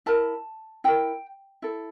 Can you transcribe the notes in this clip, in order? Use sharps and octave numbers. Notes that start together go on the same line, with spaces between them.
E4 A#4 A5
E4 A#4 G5
E4 A4